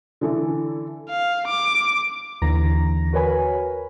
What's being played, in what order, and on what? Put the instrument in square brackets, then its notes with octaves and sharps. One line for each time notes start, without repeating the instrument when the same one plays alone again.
[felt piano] D3 E3 A4
[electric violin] F5
D6
[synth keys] D#2 D3 E3 A#5 A#6
F#4 A#4 B4 C#5 G#5 B5